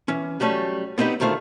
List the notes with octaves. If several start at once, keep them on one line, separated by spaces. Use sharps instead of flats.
E3 C#4
F#3 G3 A3 C#4
B3 C4 D#4 G4 B4
D2 D#3 A3 F4 C5